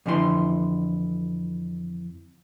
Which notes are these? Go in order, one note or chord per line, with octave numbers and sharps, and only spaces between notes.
F2 D3 E3 F#4 C6